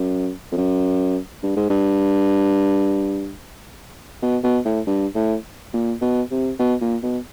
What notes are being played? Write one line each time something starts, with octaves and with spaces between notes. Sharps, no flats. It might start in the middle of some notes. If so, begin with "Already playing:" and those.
Already playing: F#2
F2
F#2
G2
G#2
G2
B2
B2
A2
G2
A2
A#2
B2
C3
B2
A#2
B2